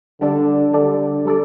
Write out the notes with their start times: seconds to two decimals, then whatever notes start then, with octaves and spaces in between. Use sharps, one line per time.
0.21 D3 G3 D4 A4 D5
0.73 D3 G3 D4 A4 D5
1.25 G3 D4 A4 D5